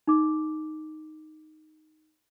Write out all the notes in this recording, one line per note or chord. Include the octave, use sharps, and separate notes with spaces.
D#4 D6